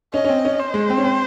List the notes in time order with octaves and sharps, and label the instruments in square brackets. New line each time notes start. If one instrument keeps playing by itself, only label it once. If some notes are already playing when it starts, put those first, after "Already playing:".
[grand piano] C#4 [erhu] D#5
[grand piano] C#4
C4
C#4
[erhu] C5
[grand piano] G#3
C4
C#4
C4